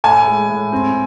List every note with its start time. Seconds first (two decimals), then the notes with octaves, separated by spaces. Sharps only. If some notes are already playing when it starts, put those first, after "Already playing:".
0.04 A2 G#5
0.27 G#3
0.49 A2
0.72 C4